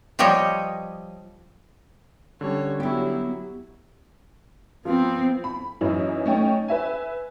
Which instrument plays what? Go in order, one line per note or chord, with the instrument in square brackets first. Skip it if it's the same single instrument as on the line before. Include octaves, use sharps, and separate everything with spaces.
[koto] F3 G3 G4 C#5 D#5
[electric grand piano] D3 G3 C#4 [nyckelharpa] C#5
[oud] F#3 G4 [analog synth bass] B3 [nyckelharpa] E4
[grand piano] F3 [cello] B3 C4
[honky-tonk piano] B5
F#2 E3 D#4 E4
A3 C#4 D#4 G5
B4 E5 G#5